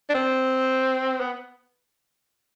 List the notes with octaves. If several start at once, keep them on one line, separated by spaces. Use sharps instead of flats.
D4
C4
B3